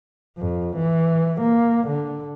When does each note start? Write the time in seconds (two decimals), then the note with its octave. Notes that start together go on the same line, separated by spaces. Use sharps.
0.38 F2
0.77 E3
1.41 A#3
1.87 D3